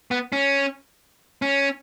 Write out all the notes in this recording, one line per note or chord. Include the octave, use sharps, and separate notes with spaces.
B3
C#4
C#4